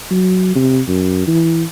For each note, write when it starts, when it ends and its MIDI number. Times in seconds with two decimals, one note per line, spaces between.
0.11 0.55 54
0.55 0.80 48
0.88 1.26 42
1.27 1.63 52